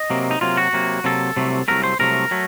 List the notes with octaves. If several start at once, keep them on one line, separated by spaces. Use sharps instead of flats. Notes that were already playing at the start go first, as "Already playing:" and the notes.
Already playing: D#5
C3 F#3 A#3
D#4
C3 F#3 A#3 F4
F#4
C3 F#3 A#3
C3 F#3 A#3 A4
C2 C3 F#3 A3
C2 C3 F#3 A3 A#4
C5
C2 C3 F#3 A3 A#4
F#3 A3